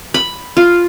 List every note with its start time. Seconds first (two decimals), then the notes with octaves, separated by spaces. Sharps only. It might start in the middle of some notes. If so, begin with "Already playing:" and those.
0.14 B5
0.57 F4